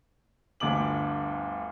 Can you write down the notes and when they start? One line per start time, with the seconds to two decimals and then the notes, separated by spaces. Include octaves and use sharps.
0.60 G1 D2 D6 F#7